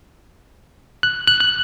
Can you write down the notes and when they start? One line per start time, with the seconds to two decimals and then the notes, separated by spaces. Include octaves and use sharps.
1.03 F#6
1.27 F#6
1.40 F#6